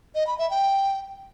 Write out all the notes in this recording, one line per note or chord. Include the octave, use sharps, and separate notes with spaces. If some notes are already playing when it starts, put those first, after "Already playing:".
D#5
B5
E5
G5